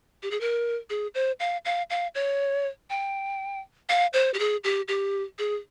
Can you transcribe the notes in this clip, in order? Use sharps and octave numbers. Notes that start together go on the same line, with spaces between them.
G4
G#4
A#4
G#4
C5
F5
F5
F5
C#5
G5
F5
C5
G4
G#4
G4
G4
G#4